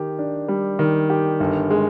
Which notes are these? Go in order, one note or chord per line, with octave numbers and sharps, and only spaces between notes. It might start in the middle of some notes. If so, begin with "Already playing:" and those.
Already playing: D#3 G4
D4
G3
D#3
G4
G1
G#3